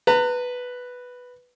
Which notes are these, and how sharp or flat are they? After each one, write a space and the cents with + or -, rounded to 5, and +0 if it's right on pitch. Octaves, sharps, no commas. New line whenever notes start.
B4 +0 A#5 -40